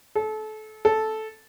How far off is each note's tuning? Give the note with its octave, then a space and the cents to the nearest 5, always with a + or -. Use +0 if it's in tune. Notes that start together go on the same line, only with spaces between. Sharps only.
A4 -30
A4 -10